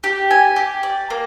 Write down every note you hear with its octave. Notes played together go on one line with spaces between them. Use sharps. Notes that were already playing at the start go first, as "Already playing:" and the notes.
G4
G#5
G4
D5
A#3